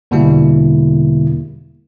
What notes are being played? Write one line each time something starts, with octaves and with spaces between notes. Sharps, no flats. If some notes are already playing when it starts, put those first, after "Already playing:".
E2 B2 D3 G3 A#3 E4